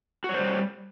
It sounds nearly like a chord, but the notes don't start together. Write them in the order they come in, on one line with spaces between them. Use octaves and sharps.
F#4 C#5 C5 G3